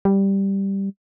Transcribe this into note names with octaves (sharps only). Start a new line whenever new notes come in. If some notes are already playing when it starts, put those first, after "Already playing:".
G3